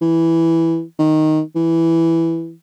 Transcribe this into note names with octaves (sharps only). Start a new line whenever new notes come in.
E3
D#3
E3